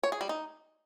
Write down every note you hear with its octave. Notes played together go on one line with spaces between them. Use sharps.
C#5
G#4
G3
D#4